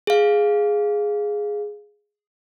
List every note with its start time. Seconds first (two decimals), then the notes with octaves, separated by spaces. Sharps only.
0.07 G#4 F5